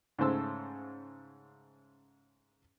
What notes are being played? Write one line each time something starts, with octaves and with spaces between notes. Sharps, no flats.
G#2 C#3 A3 C5 A5 E6